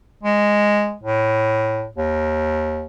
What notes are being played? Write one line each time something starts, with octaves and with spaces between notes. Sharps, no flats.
G#3
A2
D#2